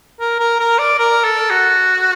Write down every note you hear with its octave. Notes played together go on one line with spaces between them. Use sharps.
A#4
A#4
A#4
D5
A#4
A4
F#4